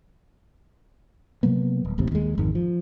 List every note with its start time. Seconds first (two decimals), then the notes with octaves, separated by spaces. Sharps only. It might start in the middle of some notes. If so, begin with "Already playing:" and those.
1.43 C3 F#3 A#3 B3
1.85 D#1
1.98 D#1 A1 D#2 C3
2.12 D#2 G#3
2.38 G#1 F2 D#3
2.55 F3